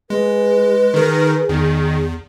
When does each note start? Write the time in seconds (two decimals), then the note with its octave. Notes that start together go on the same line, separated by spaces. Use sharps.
0.10 G#3 G#4 B4
0.94 D#3 G#4 A#4
1.49 E2 D#3